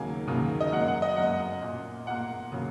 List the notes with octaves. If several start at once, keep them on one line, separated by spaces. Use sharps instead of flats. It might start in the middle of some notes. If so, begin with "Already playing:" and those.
Already playing: D#2 C#3 F#3 A#3 G#5
D#2 C#3 F#3 A#3
D#5
F#2 F#3 A#3 F#5
F#5
D#5
F#2 F#3 A#3 F#5
A#2 A#3
A#2 A#3 F#5
C#3 F#3 A#3